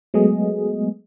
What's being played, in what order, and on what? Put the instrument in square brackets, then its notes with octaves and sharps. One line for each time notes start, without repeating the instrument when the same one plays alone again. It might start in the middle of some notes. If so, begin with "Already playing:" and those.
[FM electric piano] F#3 G#3 A3 B3 G#4 D#5